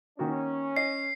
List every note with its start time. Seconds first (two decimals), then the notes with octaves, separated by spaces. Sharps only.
0.19 D#3 A#3 C#4 F#4
0.76 D#5 C7